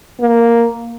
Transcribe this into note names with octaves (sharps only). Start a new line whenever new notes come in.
A#3